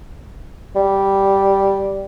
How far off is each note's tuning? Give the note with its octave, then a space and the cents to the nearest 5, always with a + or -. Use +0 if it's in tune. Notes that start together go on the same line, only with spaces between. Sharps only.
G3 -5